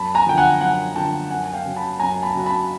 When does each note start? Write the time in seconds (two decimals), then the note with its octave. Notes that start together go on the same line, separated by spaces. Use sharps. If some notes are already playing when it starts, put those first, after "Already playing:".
Already playing: F#2 A5 B5
0.15 G#5 A#5
0.27 D3 F3 G5
0.38 F#5 G#5
0.61 F#2 F#5 G#5
0.95 D3 F3 G5 A5
1.30 F#2 F#5 G#5
1.44 G#5
1.53 F5 G5
1.65 C#3 F#3
1.76 A5 B5
2.00 F#2 G#5 A#5
2.23 A5 B5
2.34 C#3 F#3
2.46 A5 B5